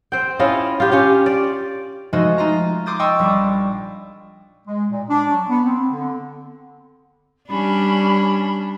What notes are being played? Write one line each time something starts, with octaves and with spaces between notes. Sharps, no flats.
C4 G5
C#4 E4 F4 D#5
F4 G4
C#4 F4 G4
D5
F3 G#3 A3 D#4 F#4 D#5
D#4 F4 A#5
C6 D6 D#6 G6 A6
D#5 G5 C6 C#6 D#6 E6
A#1 G3 D6
G#3
A#2
D4
F#3
B3
C4
D3
G3 C#4 D4 B5